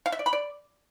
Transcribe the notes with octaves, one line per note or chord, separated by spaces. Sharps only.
F5
E5
D5
B5
D5